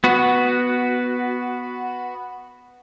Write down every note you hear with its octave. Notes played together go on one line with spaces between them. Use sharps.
B3 F#4